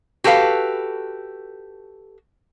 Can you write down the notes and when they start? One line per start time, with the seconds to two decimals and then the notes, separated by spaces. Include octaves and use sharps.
0.24 F#4 G4 A4 B4 F5